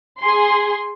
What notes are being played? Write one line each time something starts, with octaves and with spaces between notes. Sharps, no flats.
G#4 C6